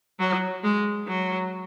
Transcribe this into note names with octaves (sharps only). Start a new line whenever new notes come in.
F#3
G#3
F#3